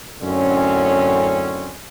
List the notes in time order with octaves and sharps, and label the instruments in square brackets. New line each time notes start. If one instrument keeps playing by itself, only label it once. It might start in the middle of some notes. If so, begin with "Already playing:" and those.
[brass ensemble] F#2 A2 D3 C4 C#4